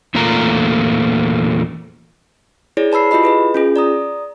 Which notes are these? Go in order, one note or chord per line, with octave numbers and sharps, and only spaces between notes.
E2 A#2 A3 A#3 F4 A#5
E4 G#4 C#5 D5
B4 A5 B5 E6 C7
E4 F4 G4 D#5 B5
G#4 B4 D#5
C#4 F4 G#4
D5 A#5 D#6